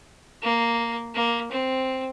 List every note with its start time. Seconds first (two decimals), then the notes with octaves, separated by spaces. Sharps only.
0.43 A#3
1.14 A#3
1.51 C4